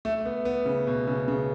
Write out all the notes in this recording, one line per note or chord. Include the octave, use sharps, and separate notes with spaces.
A3
B3
B3
C#3
B2
C#3
C#3